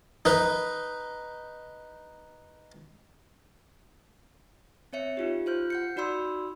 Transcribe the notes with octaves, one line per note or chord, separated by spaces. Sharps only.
D#4 B4
C4 C#5 E5 C#7
D#4 F4 G4
F4 C5 F6 G6
F#5 G6 C#7
D#4 F#4 D5 B5 C6 E6